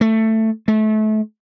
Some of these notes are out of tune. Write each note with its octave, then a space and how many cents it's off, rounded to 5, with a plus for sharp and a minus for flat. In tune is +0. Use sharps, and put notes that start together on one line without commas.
A3 +10
A3 -30